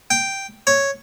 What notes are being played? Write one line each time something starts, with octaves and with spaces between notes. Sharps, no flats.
G5
C#5